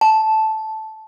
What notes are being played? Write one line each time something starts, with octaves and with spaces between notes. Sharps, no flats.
A5